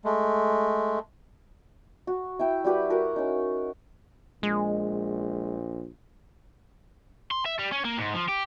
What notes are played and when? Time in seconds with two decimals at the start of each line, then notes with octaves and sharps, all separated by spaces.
0.05 G#3 A3
2.07 F#4
2.39 E4 E5 G5
2.64 G3 F#4 G4 B4
2.90 F#4 A#4 A#5
3.16 C#4 D#4
4.43 A#1 G#3
7.31 C6
7.46 E5
7.59 G3
7.72 C#4
7.85 A#3
7.98 G#2
8.15 F3
8.29 G4